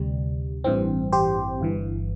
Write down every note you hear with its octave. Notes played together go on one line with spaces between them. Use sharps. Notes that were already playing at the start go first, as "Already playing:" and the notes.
Already playing: D2 C3 G3
A1 G2 E3 C4
G4 C5
G1 G2 E3